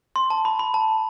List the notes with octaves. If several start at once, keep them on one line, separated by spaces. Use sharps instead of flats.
C6
A5
B5
B5
A5